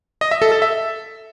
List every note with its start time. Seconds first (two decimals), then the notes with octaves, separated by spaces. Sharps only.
0.21 D#5
0.31 E5
0.42 A4
0.52 A4
0.62 E5